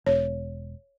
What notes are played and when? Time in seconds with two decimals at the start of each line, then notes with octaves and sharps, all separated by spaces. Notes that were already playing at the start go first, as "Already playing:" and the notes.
0.06 E1 C#5